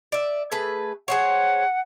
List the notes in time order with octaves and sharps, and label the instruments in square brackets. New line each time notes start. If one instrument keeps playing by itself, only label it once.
[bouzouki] D5 E5
A3 G#4 B4
[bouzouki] G#4 C5 C#5 [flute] F#5